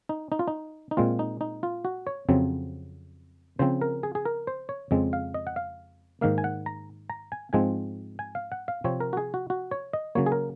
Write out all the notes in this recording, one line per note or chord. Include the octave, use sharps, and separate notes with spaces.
D#4
D#4
F4
D#4
D#4
A#2 G#3 C4 F4
D#4
D#4
F4
F#4
C#5
F2 C#3 F#3 C4
C#3 F3 C4 C5
A#4
G#4
G#4
A#4
C5
C#5
F2 C#3 G#3 C4
F5
D#5
F#5
F5
G#2 D#3 A#3 F5
G#5
F#5
A#5
A#5
G#5
G#2 F3 G#3 C4 G#5
G#5
F5
F#5
F5
C3 F3 C4 C#5
A#4
F#4
G#4
F#4
F#4
C#5
D#5
C#3 F#3 A#3 C#5
G#4
A#4